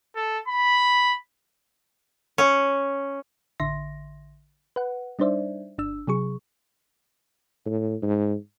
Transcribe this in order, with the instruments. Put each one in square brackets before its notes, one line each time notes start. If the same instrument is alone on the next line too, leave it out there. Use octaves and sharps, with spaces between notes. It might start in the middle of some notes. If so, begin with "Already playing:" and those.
[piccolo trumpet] A4
B5
[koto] C#4
[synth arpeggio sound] A1 D3 E5 C6 A#6
B4 F#5
G3 D4 D#4 C5 D5 E5
G1 D4 E6
C3 F#3 G#4 C#6
[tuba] A2
G#2